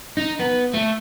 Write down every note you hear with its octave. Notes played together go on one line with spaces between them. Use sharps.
D#4
B3
A3